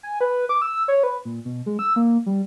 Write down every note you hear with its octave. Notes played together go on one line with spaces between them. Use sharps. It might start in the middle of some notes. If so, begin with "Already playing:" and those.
G#5
B4
D6
E6
C#5
B4
A#2
B2
G#3
E6
A#3
G3